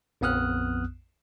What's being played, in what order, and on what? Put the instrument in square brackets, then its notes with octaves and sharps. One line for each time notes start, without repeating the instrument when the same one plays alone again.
[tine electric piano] A#1 F2 B3 D#6 F6 F#6